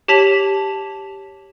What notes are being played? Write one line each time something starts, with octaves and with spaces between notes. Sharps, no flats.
G4 C#5 A5 B6 F7 F#7